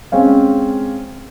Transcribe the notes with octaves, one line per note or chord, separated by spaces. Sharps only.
G#3 C4 C#4 F5